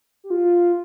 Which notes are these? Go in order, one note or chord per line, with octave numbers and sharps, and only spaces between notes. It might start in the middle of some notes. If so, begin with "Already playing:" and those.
G4
F4